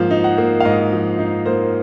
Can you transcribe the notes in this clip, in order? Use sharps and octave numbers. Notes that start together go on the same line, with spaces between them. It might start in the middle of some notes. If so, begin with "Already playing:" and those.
Already playing: G#2 F3 A#3 F5
D#4
F#5
A#3
F5
G#2 D#5
F3
D#4
A#3 C5